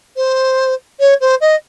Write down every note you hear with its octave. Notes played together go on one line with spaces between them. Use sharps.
C5
C#5
C5
D#5